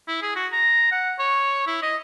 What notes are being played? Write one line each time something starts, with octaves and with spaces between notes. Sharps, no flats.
E4
G#4
F#4
A#5
F#5
C#5
E4
D#5